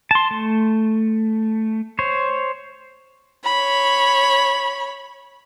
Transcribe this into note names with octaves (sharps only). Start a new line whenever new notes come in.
A5 C6
A3
C5 C#5
C#5 B5